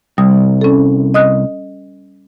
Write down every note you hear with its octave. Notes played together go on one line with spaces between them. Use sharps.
C2 G3 D#6
C#4 A4
D#5 D#6 F#6